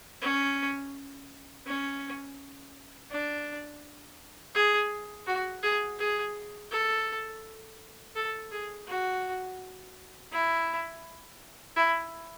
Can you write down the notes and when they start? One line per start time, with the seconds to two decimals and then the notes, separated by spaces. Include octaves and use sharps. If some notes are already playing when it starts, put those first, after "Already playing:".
0.22 C#4
1.66 C#4
3.11 D4
4.55 G#4
5.27 F#4
5.63 G#4
5.99 G#4
6.71 A4
8.16 A4
8.52 G#4
8.87 F#4
10.32 E4
11.76 E4